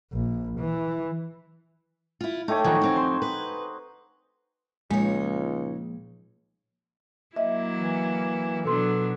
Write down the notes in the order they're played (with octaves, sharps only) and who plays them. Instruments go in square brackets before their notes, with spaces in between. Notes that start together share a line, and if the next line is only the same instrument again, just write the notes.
[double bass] A#1
E3
[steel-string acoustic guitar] E4 F4
[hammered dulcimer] A3 G4 C#5 [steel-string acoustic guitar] D#4
[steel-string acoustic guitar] F#2 D#3 F3 [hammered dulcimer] D#4 F#4 G#5
[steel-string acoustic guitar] F2 C4
[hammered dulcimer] C5
[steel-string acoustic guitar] B4
[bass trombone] C#2 [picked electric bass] A#2 F3 [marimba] G#3 [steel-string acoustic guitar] D#4 C#5
[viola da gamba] F#3 A#3 E4 [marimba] D#5 E5
[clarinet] E3
[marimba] B2 C6 [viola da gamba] F#3 B3 D4 [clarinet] A4